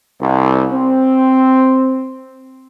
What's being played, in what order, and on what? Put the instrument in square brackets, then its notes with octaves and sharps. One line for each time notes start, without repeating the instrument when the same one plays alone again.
[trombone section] C2
C4